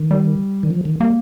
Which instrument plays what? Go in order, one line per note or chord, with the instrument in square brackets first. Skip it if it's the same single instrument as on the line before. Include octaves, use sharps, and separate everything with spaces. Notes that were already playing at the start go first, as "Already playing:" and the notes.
Already playing: [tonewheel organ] D#3
[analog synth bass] G3
[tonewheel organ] D#3
F3
D#3
[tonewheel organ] G3 [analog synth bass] A#3